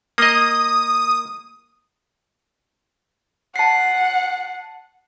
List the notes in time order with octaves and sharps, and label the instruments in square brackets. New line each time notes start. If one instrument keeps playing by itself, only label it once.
[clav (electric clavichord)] A#3 D#5 [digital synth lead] D#6
[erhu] F#5 [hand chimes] A5 C7